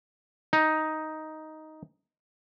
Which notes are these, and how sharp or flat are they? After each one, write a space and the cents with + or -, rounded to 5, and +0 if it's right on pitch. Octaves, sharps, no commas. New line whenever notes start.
D#4 +5